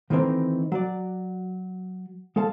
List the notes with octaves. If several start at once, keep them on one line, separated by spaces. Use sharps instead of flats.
D#3 E3 A3 C4 D#4
F#3 D5
G#3 A4 F5 A5